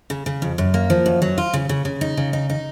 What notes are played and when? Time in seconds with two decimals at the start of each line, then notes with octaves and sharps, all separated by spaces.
0.10 C#3
0.26 C#3
0.42 F2
0.58 F#2
0.74 A#3
0.90 F3
1.06 F#2
1.22 F#3
1.38 F4
1.53 C#3
1.69 C#3
1.85 C#3
2.01 D#4
2.17 C#3
2.33 D#4
2.50 D#4